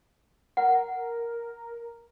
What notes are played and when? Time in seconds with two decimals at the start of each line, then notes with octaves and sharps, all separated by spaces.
0.57 A#4 F#5